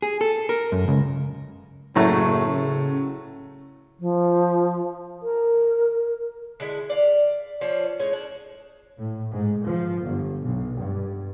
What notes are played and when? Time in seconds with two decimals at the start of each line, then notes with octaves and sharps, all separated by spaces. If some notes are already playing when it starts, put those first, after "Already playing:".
0.02 G#4
0.21 A4
0.49 A#4
0.72 F#2
0.88 C#2
1.95 F#1 A2 F#3 A3
2.47 C#3
4.00 F3
5.23 A#4
6.60 D3 G#3 E4
6.89 D5 F5
7.61 F3 C#4 D4 F4
7.99 A2 G#3 C#4 C#5
8.13 D4
8.97 A2
9.32 G#2
9.66 F3
10.03 G1
10.44 B1
10.80 G2